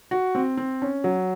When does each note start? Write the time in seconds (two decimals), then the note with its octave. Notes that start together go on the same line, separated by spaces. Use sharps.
0.11 F#4
0.35 C4
0.57 C4
0.82 C#4
1.04 F#3